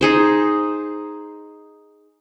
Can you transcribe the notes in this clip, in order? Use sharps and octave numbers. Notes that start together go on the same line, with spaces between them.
D#4 G#4 C5